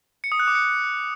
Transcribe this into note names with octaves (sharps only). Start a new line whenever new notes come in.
C#7
D#6
F#6
D6
C#7